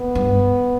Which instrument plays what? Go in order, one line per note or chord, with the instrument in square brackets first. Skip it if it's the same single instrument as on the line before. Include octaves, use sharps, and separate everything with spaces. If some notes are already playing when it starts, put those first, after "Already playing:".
Already playing: [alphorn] B3
[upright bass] G2